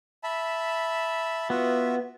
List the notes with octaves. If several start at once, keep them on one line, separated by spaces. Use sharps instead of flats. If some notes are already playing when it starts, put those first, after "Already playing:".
E5 A5 B5
B3 F4 F#4 E5